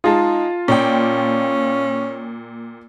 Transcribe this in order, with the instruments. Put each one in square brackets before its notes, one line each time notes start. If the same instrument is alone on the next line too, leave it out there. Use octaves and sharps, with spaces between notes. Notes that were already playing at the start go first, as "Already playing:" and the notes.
[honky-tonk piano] G#3 G#4 [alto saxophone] D#4 [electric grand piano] F4 A5
[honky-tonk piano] A#2 D5 G5 [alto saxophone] C#4